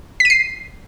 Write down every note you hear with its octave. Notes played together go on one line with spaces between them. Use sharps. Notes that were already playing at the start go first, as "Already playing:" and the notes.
B6 C7 D#7